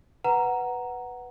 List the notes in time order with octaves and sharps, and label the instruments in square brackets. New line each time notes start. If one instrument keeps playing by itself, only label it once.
[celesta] B4 F#5 A#5